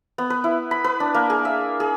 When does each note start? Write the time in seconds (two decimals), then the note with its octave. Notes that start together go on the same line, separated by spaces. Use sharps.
0.18 B3
0.30 B4
0.44 E4
0.71 B5
0.84 B4
1.00 D4
1.14 A#3
1.30 G#4
1.45 E5
1.80 G#4